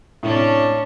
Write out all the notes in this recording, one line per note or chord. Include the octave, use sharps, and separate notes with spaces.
A2 C3 C#4 D4